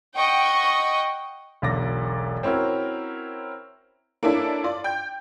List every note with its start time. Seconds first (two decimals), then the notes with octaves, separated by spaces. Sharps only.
0.16 D#5 F#5 G5 C#6
1.62 E1 B1 D3 D5 D6 A#6
2.43 C4 C#4 E4 F#4 A#4
4.23 A#3 C#4 D4 E4 A4 D5
4.64 F4 D5
4.84 G5 G6